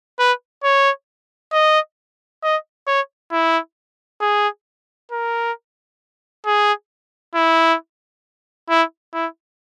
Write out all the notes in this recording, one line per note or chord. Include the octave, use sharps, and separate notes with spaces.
B4
C#5
D#5
D#5
C#5
E4
G#4
A#4
G#4
E4
E4
E4